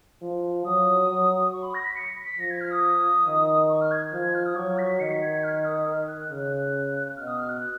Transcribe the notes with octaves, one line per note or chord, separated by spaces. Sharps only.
F3
F#3 D#6
F#3
C#6
B5
A#6
B6
C#7
B6
F3 A#6
G#6
F6
D#6
D#3
C#6
F6
G#6
F3
G#6
F6
D#6
F#3 C#6
B6
D#3 C#7
B6
G#6
G#6
F6
D#6
F6
F#6
C#3 F#6
B2 F6
D#6
F6
F#6